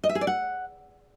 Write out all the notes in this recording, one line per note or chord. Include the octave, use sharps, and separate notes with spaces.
D#5
E5
G#4
D5
F#5